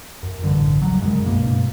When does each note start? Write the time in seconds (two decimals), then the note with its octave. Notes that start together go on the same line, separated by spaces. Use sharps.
0.23 F#2
0.42 A1 G2 D3
0.82 D#1 C#3 F#3
1.01 F#2 C#3 G#3
1.26 C2 G2 B2 A#3